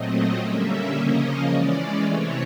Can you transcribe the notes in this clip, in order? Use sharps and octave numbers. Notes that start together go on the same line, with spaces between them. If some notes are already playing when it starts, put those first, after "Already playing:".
Already playing: A#2 F#3 A3 C4 D#5
D3 G3 A#3 C#4 E5
C#3 F3 A#3 C#4 D#5
E3 G#3 C#4 D5
C3 E3 A3 C4 C#5